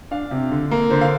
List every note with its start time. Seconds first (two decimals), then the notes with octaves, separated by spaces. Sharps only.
0.11 D4 F5
0.31 C3
0.51 D3
0.71 A#3
0.90 D3 C5
1.01 F5